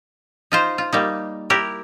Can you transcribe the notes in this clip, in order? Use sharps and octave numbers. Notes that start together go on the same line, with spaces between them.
D#4 F4 C5
F4
G3 A#3 D#4
E4 G4 A#4